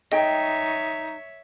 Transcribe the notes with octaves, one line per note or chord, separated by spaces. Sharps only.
D#4 G#4 C#5 D#5 E5 G5